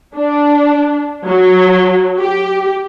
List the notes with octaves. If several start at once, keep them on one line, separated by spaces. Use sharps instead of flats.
D4
F#3
G4